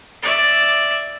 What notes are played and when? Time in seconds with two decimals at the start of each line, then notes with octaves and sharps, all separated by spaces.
0.22 D5 E5